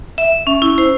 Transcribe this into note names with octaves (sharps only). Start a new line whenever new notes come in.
E5
C#4
E4
C5